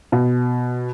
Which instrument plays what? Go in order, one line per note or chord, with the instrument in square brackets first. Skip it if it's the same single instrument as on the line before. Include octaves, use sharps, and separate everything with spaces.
[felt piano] B2